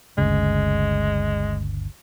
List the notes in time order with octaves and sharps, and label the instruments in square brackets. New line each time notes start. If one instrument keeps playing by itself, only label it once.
[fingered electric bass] G1 D2 C#3 [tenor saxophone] G#3